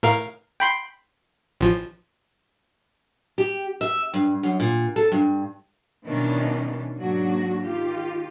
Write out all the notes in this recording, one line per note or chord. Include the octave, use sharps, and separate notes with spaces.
A2 A#4 F5
G5 B5 C6
A1 F3
G4
E5
G2
F#2
A#2
A4
G2
B2 D#3 E3 G3 C#4 D4
G#2 F#3 A#3 D4 F#4
D#3 F4 G4